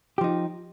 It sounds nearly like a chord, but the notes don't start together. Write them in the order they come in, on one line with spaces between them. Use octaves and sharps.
G4 F3 D#4